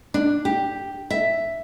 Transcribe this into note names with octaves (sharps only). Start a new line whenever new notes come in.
D4
G4
E5